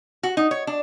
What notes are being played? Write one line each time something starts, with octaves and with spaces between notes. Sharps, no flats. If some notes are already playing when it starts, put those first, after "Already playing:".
F#4
D#4
C#5
D4